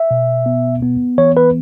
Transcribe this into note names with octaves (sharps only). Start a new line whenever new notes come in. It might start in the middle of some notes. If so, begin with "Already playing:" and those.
Already playing: E5
B2
B3
B3
E3 C#5
B4